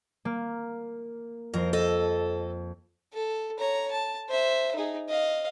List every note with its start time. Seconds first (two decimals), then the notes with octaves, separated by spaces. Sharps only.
0.25 A#3
1.54 F2 A#4 C5
1.73 A4 D#5
3.14 A4
3.59 C#5 A#5
3.92 A5
4.29 C5 E5
4.76 D#4 G#4
5.09 D#5 F5